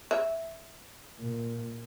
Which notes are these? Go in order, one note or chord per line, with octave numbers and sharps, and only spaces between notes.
E5
A#2